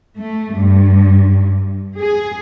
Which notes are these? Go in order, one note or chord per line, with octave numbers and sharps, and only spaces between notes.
A3
G2
G#4